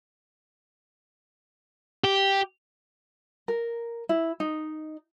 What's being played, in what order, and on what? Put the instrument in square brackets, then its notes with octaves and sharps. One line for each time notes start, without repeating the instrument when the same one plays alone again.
[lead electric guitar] G4
[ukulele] A#4
E4
D#4